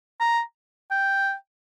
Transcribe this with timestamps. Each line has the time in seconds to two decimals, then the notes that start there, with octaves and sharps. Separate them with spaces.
0.20 A#5
0.91 G5